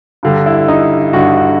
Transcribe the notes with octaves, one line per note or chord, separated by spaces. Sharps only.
G2 D3 G3
E4
D#4
G2 D3 G3 F#4